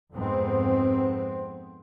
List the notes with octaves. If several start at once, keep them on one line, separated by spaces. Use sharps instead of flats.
F2 G#2 B3 C4